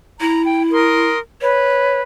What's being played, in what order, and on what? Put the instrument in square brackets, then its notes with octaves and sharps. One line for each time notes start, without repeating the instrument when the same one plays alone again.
[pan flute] E4 [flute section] A#5
[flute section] G5
A#4 C6 D#6
[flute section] B4 [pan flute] C#5